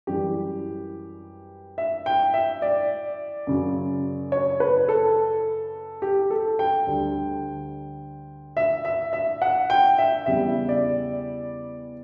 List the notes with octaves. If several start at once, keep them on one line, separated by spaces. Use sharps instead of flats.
F#2 E3 G3 G4
E5
G5
E5
D5
F#2 C#3 F#3
C#5
B4
A4
G4
A4
G5
D2 D3 G3
E5
E5
E5
F#5
G5
E5
E2 C#3 G3 E5
D5